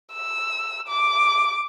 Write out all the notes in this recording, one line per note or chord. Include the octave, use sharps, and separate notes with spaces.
E6
D6